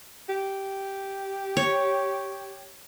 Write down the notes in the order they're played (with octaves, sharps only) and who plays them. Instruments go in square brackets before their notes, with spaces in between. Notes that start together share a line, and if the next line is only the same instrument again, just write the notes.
[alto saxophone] G4
[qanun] C#5